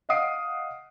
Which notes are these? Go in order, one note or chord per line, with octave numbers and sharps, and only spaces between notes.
D#5 F5 F#5 D#6 C7 D7